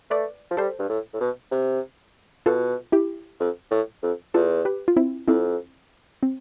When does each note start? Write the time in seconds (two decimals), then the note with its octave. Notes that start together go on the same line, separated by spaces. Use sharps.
0.10 A3 B4 D5
0.51 F3
0.57 G3 A4 C5
0.79 G2
0.89 A2
1.14 A2
1.20 B2
1.51 C3
2.46 B2 F4 A4
2.92 E4 G4
3.40 F2
3.71 A2
4.03 F2
4.34 E2 F4 A4
4.65 G4 B4
4.88 F4
4.97 C4 E4
5.28 F2 C4 E4
6.23 C4